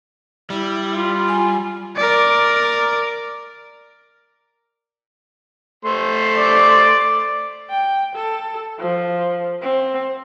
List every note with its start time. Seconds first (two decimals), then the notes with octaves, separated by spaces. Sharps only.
0.50 G3 E4
0.95 F4
1.28 G#5
1.96 A#4 D5
5.85 A3 C5 C6
6.36 D5
7.70 G5
8.16 A4
8.79 F3
9.61 C4